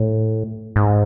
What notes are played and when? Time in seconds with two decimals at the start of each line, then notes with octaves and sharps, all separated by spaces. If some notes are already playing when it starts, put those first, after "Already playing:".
Already playing: A2
0.76 G#2